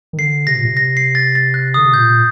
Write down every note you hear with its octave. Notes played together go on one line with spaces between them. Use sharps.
D#3
D3 C7
C3 A#6
A#2
C3
A#6
C7
A6
A6
F#6
D3 D#6
C3
A#2 G6